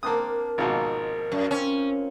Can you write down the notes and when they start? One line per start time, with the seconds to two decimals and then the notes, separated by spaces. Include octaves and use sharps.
0.03 A#3 C4 D4 A#4 A5 D#6
0.58 G#1 B2 F3 A#3 D#4
1.32 F#2
1.51 C4 C#4